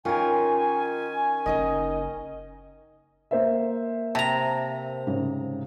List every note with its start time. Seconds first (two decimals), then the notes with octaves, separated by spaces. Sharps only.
0.05 D#3 C#4 F4 A#4 G#5
1.46 F#1 C#4 D#4 A#4 D#5
3.31 A#3 C5 E5
4.15 C3 A5 A#5
5.07 G#2 C#3